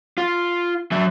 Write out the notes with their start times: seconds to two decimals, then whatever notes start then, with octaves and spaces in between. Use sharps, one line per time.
0.18 F4
0.91 F#3 E5